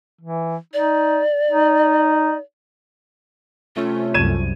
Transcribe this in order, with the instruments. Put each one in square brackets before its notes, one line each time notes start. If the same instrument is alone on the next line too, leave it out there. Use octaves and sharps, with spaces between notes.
[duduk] E3
[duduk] D#4 [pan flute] D5
[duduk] D#4
[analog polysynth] C3 A3 C#4 [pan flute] F4
[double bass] C2 F#2 [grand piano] G#6 D#7 E7